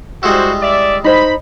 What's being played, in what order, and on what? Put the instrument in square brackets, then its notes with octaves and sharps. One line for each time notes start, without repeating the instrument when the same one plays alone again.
[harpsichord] G3 G#3 E4 [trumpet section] F#4 C5
[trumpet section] D5 E5
[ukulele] D#4 C5 [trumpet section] B5